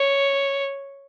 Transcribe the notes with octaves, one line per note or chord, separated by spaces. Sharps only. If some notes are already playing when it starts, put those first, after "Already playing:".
Already playing: C#5